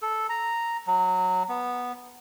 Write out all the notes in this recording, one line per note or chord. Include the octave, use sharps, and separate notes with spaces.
A4
A#5
F#3
B3